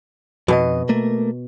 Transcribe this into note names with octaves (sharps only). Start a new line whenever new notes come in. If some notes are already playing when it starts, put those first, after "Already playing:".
F2 B2 G#4 D#5
A3 A#3 A#4